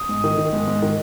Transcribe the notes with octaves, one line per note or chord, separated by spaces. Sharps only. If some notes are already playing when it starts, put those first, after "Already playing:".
Already playing: D#6
G#2
D#3
D#3
G#2
G#2
D#3